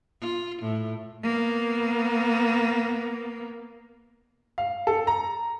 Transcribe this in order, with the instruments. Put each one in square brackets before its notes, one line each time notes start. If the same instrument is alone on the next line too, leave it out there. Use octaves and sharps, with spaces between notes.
[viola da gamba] F4
A2
[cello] A#3 B3
[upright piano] F5
A4
A#5